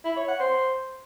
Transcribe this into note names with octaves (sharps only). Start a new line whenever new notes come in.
E4
C#5
F#5
C5